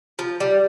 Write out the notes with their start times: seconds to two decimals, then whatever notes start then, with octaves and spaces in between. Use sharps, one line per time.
0.19 F3
0.40 G3